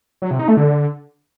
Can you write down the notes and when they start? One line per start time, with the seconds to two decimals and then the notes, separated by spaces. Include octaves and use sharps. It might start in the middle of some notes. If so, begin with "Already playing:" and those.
0.22 F#3
0.31 C3
0.39 D#4
0.48 A3
0.57 D3